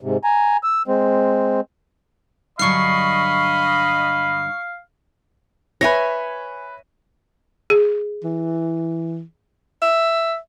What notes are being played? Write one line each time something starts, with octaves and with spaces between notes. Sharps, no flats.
G#2 C3
G#5 A#5
E6
G#3 C4
G2 D3 F#3 D#5 F5 B5 C#6 C7
B4 C#5 E5 G#5 A#6
G#4
E3
E5